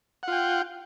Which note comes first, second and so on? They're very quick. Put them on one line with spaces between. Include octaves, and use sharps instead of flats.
F#5 F4 G5